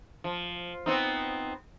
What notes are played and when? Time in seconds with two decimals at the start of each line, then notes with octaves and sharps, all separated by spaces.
0.24 F3
0.86 B3 C4 D#4